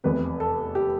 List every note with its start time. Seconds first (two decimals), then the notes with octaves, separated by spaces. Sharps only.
0.04 F1 E2 C3 B4
0.40 A4
0.75 G4